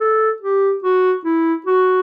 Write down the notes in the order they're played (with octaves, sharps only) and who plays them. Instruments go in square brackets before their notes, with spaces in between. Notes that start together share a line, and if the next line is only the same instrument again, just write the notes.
[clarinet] A4
G4
F#4
E4
F#4